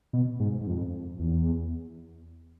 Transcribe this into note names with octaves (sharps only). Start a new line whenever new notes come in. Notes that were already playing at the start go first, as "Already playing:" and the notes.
B2
G#2
G#2
F2
E2